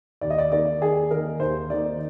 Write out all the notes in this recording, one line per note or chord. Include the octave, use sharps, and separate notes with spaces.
D#2 D5
D#5
D5
D#3 A#3 D#4 D5
D#2 G#4
D#3 A#3 D#4 A#4
D#2 C5
D#3 A#3 D#4 D5